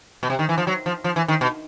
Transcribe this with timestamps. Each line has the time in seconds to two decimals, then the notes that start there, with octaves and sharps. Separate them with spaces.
0.23 B2
0.30 C3
0.39 D#3
0.49 E3
0.58 F3
0.67 F#3
0.86 F3
1.04 F3
1.16 E3
1.28 D#3
1.41 B2